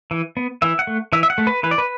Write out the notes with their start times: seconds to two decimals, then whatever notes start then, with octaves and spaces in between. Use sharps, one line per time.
0.11 E3
0.37 B3
0.62 E3 E5
0.79 F#5
0.87 A3
1.13 E3 E5
1.23 E5
1.30 F#5
1.38 A3
1.47 B4
1.63 E3 B4
1.71 D5
1.78 B4